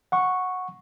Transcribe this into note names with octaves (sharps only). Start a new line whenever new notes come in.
F#5 C#6